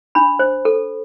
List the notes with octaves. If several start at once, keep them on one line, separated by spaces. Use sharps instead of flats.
D4 B5
C5
A4